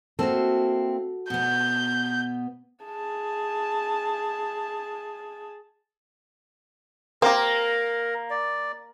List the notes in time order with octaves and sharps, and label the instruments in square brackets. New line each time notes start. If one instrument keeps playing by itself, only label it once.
[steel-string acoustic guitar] A#3 C4 E4 [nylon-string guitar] F#4 A4
[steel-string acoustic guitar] B2 B3 [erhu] G6
[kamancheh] G#4 A5
[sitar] A#3 [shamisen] C4 G4 [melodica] A#4
[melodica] D5